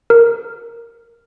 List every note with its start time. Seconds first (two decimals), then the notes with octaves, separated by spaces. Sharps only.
0.10 A#4